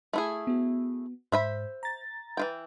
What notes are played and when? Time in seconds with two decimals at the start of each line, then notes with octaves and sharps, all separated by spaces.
0.13 A3 E4 G#4
0.47 B3 F#4
1.32 G#2 C5 E5 B5
1.83 A#5 A6
2.37 E3 F4 G5